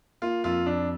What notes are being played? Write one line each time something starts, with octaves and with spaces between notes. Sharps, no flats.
A#3 F4
F2 F4
F2 D4